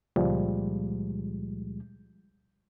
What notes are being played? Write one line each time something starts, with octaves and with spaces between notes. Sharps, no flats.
C#2 A#2 F3 G3 G#3